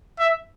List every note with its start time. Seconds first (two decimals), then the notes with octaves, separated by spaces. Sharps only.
0.19 E5